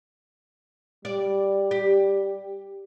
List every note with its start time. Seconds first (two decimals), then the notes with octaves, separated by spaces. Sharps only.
1.05 G3 D5
1.71 G4